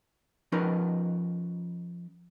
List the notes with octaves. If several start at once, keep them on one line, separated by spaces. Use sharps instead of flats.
F3 C#4 D#4 A#4 B4